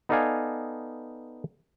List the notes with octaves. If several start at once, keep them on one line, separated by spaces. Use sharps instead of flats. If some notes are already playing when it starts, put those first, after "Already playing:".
B3 D#4 A4 D5 F5 G#5